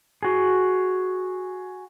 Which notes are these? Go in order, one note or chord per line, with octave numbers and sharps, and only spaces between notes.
F#4 G#4